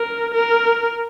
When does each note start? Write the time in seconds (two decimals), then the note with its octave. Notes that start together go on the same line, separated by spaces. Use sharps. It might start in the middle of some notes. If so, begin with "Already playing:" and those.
Already playing: A#4
0.34 A#4